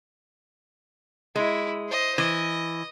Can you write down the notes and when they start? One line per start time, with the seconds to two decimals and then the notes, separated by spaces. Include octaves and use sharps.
1.36 G#3 E4
1.89 C5 D#5
2.18 E3 D#5